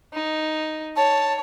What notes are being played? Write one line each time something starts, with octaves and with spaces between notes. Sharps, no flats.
D#4
C#5 A5